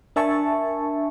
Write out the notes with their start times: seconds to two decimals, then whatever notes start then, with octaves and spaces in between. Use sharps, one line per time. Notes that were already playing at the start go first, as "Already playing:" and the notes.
0.16 D4 A#4 E5 G#5 A5 C#6